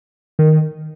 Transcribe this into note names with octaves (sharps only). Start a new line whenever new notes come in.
D#3